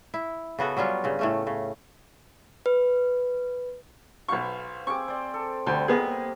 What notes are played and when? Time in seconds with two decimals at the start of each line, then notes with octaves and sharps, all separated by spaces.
0.14 E4
0.59 C#3 B3 F#4 A4
0.77 F#3 G3 C#4 F4
1.04 G2 C#3
1.19 A2 A3 C#4
1.47 C#3
2.66 B4
4.28 B1 B4 C5 F5 C#6
4.87 C4 G#4 C#6 D6
5.08 C5 D5
5.34 A4
5.67 D2 G3
5.88 C3 A#3 B3 G#4 D#5